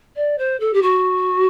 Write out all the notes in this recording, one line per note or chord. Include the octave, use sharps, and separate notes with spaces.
D5
C5
A4
G4
F#4